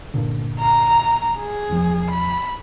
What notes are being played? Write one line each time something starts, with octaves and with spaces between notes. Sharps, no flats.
G2 A#2 D3
A#5
G#4
E1 F3
B5